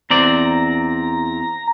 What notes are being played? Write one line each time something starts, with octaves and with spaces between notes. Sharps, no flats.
E2 C4 D5 A#5